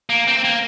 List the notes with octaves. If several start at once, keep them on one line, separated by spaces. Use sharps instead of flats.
A#3
C4
A#3